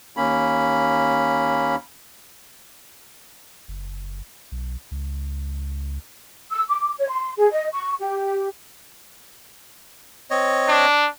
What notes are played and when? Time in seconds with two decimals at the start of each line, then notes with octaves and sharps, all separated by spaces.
0.17 D#2 A#3 C#4 B5
3.68 F#1
4.52 B1
4.91 C#2
6.51 E6
6.69 D6
6.99 C#5
7.10 C6
7.38 G#4
7.52 D#5
7.72 C#6
8.00 G4
10.31 C4 C#5 D#5
10.68 D4